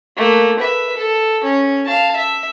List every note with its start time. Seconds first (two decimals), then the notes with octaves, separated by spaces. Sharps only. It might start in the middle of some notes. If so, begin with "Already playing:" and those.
0.16 A3 A#3
0.60 B4 E5
0.97 A4
1.44 C#4
1.85 F5 A5
2.16 E5